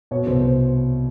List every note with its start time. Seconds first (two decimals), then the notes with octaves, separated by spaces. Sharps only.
0.11 B2 C#5
0.27 C2 C5
0.42 C5